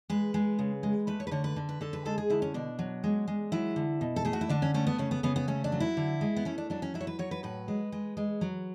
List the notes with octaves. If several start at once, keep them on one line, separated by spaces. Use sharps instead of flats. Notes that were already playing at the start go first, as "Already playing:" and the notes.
G#3 B4
G#3
C#3
G#3
A3 B4
C#5
B4
D3 C#5
B4
D3
B4
D3 A4
B4
G#3 A4
G#4
D3 E4
C#4
B2 D4
F#3
G#3
G#3
F#3 E4
D3
B2
A4
A3 G#4
F#4
E4
D3 D4
C#4
A3 C#4
B3
C#3 C#4
B3
C#3 B3
B3
A3 C#4
D4
F#3
E4
D3
G#3
B3
A3 C#4
D4
F#3 D4
C#4
F#3 E4
C#5
B4
F#3 C#5
B4
A2 B4
G#3
G#3
G#3
F#3